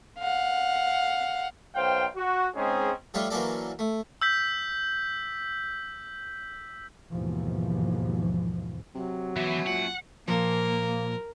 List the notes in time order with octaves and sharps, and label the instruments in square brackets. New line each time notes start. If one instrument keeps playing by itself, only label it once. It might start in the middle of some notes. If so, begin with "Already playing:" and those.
[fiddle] F5 F#5
[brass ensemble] B1 C5 F5 G5
F#4
G#3 C4 C#4 D#4 G#4
[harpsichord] F3 G3 A3 F4 C#5
E3 F#3 A#3 C#4 A4 D5
A3
[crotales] E6 G6 B6
[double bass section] D#2 G#2 B2 E3 F3
[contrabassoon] C3 [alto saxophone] F#3
[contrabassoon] B2 [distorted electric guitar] E3 [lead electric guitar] C#4 E5
[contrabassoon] A#2 [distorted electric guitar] F#5
[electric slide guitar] A#2 [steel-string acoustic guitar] F3 [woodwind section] A#3 [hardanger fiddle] A#4